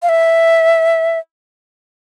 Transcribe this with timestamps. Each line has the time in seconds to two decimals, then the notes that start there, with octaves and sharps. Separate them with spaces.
0.02 F5
0.09 E5